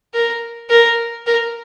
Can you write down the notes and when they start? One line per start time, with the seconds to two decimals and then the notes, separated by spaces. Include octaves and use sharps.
0.14 A#4
0.70 A#4
1.27 A#4